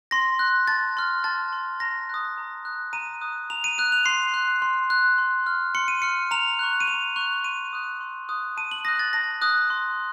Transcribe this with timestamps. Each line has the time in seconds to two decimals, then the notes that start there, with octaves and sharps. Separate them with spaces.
0.11 C6 A#6
0.39 F#6
0.67 A5 A6
0.97 C6 F6
1.24 A5 A6
1.53 C6 F6
1.80 A#5 A#6
2.09 D#6 F#6
2.38 A#5
2.65 D#6 F#6
2.93 A#5 D#7
3.21 D#6 F#6
3.50 A#5 F7
3.64 D#7
3.78 D#6 F#6 D#7
3.92 F7
4.06 C6 C7
4.34 F#6
4.62 C6
4.90 F#6
5.18 C6
5.46 F6
5.75 C6 C#7
5.88 D#7
6.02 F6 C#7
6.31 A#5 F7
6.59 C#6 F#6
6.80 D#7
6.88 A#5 F7
7.16 C#6 F#6 F7
7.44 C6 D#7
7.73 D#6 F#6
8.00 C6
8.29 D#6 F#6
8.57 A5 D#7
8.71 F#7
8.85 D#6 F#6 A#6
8.99 A6
9.13 A5 A#6
9.42 D#6 F#6
9.70 C6